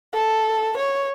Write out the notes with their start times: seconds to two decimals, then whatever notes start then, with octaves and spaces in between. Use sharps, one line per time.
0.14 A4
0.77 C#5